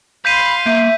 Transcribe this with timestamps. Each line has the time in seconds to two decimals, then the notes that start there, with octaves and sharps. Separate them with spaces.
0.25 F5 B5 C6 G6 B6 D#7
0.66 A#3 E5 G6